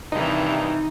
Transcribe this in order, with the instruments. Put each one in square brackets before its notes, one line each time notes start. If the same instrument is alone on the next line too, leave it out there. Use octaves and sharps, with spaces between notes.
[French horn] G2 [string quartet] C3 D#3 E3 [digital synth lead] D#4